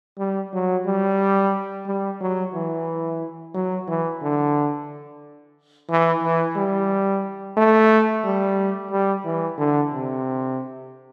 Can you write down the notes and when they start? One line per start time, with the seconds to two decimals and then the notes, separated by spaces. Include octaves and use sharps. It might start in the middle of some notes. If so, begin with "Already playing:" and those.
0.19 G3
0.53 F#3
0.86 G3
1.86 G3
2.21 F#3
2.54 E3
3.54 F#3
3.88 E3
4.21 D3
5.90 E3
6.22 E3
6.56 G3
7.57 A3
8.24 G3
8.91 G3
9.24 E3
9.58 D3
9.92 C3